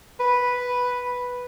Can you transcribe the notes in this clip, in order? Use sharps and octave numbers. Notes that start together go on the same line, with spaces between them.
B4